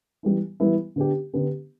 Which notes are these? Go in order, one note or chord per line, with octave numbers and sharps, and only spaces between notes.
E3 G3 B3 E4
E3 G3 B3 E4
D3 B3 D4 G4
D3 B3 D4 G4